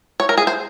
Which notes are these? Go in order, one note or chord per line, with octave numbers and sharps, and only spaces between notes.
C#5
A#4
G#4
C5